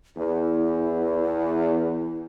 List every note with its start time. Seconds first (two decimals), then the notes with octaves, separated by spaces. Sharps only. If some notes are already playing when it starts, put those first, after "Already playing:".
0.17 E2 E4